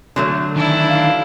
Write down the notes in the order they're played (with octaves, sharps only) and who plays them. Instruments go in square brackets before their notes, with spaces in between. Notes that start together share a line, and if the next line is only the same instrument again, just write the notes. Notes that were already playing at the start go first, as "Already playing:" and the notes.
[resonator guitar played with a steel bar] D3 F#3 A3
[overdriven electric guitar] D#3 E3 [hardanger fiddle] D4 E4
[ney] F5